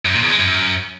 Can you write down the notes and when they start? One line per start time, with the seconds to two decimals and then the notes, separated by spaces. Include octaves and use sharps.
0.05 F#2
0.14 A#2
0.22 E2
0.31 G#3
0.39 F#2